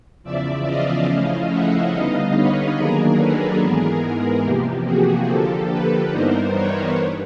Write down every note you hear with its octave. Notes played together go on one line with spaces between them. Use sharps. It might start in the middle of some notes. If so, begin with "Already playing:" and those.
E2 C#3 F3 D5 E5
D#5 F5
C#3 F3 A3 C#4 E4 D#5 F5
E5 F#5
D3 G3 B3 D#4 D#5 F5
B4 C#5
D#3 F#3 A#3 D4 G#4 A#4
A4 B4
G#2 E3 G#3 B3 G#4 A#4
G#4 A#4
E2 C3 F3 A#3 G4
F#4 G#4
D3 F3 A#3 G4 A4
A4 B4
G2 E3 G3 B3 D#4 A#4 C5
B4 C#5
G2